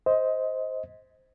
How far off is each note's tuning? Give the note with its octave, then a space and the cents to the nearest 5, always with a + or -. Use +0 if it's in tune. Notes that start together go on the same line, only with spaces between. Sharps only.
C5 +0 D#5 +20